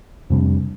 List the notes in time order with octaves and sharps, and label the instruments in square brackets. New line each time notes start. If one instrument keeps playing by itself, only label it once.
[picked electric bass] F2 C3 G3 D4